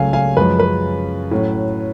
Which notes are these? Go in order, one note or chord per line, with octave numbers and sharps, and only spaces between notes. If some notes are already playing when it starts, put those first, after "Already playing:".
Already playing: C#2 C#3 F#3 A3 F5 G#5
F5 G#5
F#2 F3 G#3 C#4 B4
B4
A2 F#3 C#4